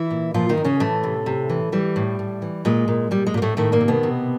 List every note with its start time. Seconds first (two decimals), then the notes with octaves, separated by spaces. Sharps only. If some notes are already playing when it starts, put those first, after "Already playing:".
Already playing: E3 E4
0.11 A#2
0.34 A#2 F3 F4
0.49 D#3 D#4
0.57 A#2
0.64 C#3 C#4
0.80 A2 E3 A3
1.04 C3
1.26 C3
1.49 E3
1.72 E3 G3
1.96 A2
2.19 A2
2.42 E3
2.65 A#2 G#3
2.88 A#2
3.11 A#2 G3
3.26 G#3
3.34 A#2
3.37 A#3
3.42 A2 A3
3.57 A2 D#3 A3
3.72 A#2 A#3
3.81 C3
3.88 B2 B3
4.03 C3